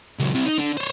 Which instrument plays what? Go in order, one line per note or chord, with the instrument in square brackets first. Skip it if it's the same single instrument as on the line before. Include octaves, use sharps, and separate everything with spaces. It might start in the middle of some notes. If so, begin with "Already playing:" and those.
[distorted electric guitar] C#2 F#3
C2 C3
D#4
D3
C5 C#5